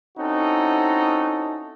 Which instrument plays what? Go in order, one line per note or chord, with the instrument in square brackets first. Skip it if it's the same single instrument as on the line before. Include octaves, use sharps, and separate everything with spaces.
[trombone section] C4 C#4 D#4 E4 F#4 A4